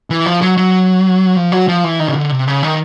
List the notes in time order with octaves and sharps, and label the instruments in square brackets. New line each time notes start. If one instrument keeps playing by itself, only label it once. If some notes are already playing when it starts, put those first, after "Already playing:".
[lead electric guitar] E3
F3
F#3
F#3
F3
F#3
F3
E3
D#3
C#3
D3
C3
C#3
D#3